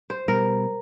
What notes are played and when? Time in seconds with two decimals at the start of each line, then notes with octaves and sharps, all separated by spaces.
0.10 C5
0.28 B2 G3 A#4